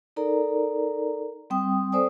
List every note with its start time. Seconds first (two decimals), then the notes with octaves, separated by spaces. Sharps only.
0.16 D#4 A4 A#4 D5 A#5
1.50 G3 C4 G5 D#6
1.92 C4 A4 C5 D5 G#5 D#6